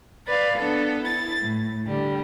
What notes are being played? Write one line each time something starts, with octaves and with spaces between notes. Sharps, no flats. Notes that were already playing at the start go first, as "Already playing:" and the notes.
B4 D5 F5
B3 D4 A4
E4 A6
A2
D3 G3